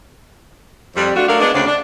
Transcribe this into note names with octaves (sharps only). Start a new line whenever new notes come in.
F2 G3
A3 D4 F4 F#4
F#3 A3 D4 A#4 F5
G#3 B3 D4
D2 C#3 C4 D4 D5
D4